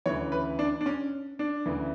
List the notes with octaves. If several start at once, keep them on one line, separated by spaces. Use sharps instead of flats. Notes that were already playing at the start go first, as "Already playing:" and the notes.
D2 C#3 E3 C#5
B4
D4
D4
C#4
D4
D2 C#3 E3